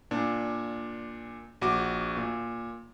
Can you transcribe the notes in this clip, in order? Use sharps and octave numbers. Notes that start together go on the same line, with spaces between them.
A#2 D4
A#1 F#4 D6
A#2